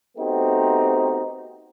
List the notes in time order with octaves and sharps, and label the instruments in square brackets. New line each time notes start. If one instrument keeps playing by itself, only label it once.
[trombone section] A3 B3 C4 D#4 F#4 G4